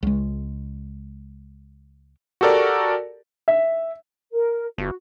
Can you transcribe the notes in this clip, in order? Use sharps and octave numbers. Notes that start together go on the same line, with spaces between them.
C#2 G#3
F#4 G4 A4 A#4 D5
E5
A#4
G1 F#4